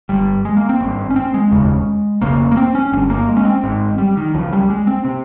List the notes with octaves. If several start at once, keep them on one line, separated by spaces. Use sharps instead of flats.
G1 G2 G3
G#3
A#3
C4
G#1 G2
C#4
C4
G#3
F1 D#2 C#3
F1 D#2 C#3 A#3
A#3
C4
C#4
G1 G2 C4
A#3
G#3
C#4
C4
G#1 G#2
G3
D#3
C#2 C#3 F3
G3
G#3
C4
C3